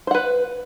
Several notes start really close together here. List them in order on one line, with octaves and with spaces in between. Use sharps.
C5 F#5 B4